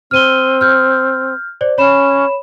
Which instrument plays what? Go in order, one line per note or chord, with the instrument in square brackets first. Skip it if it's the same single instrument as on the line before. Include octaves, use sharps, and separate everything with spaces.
[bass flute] C4 [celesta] F6 D#7 G7
[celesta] F6 G6
C5 D5
[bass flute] C#4 [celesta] C#5 B5 E7